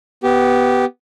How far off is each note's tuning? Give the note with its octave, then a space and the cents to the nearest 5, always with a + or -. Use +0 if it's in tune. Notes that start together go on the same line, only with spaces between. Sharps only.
B3 +0 G4 -15